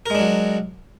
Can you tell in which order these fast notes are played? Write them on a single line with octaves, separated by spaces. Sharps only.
A#4 G#3 D4 F#3